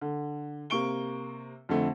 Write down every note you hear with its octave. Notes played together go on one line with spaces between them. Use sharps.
D3
C3 A#3 C#6 D7 G7
F2 D3 A3